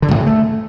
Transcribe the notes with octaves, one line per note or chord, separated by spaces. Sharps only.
D3
F#2
A2
C#3
A3